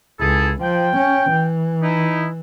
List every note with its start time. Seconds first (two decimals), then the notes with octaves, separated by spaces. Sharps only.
0.20 C#2 E4 G#4 A4
0.62 F3 G5
0.97 C#4
1.30 E3
1.83 D#4 E4